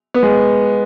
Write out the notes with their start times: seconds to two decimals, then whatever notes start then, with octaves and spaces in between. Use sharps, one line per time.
0.14 B3
0.23 G#3